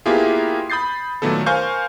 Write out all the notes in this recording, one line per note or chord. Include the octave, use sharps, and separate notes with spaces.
A#3 B3 E4 F4 G4 G#4
B5 D#6 G6 A6 C7
A#2 D#3 F#3 A3 B3 A4
A#4 C5 F5 G#5 C#6 G6